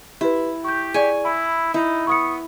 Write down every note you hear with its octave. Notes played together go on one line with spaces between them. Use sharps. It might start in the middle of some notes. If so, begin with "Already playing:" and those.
E4 G4 B4
G4 C#6 G6
G#4 D5 G#5 C#6
E4 B5
D#4 E4
B3 C#6 D#6 C#7